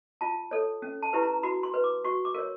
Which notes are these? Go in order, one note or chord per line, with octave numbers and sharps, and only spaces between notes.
F4 A5
A4 C#5
C#4
A5
E4 G4 B4
A#5
F#4 B5
C6
B4
D6
F#4 C#6
D6
A#4 C#5